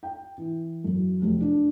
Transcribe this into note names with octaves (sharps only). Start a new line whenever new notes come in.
G5
E3
F#2
F1
D4